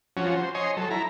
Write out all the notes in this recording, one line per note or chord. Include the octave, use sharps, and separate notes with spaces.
F3 C#4 F#4
C5
C#5 D#5 G#5 C6
F#3 A4
E4 A#5